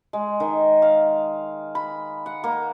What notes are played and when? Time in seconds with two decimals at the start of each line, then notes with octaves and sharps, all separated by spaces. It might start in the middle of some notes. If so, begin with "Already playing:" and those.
0.13 G#3
0.40 D#3
0.82 F5
1.75 B5
2.26 F#5
2.44 A#3